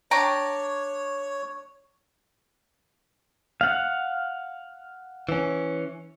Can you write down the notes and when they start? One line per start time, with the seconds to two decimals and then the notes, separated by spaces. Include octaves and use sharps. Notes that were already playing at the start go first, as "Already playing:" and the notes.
0.11 D4 C#5 G5 A#5
3.61 F5 F#5
5.29 E3 C#4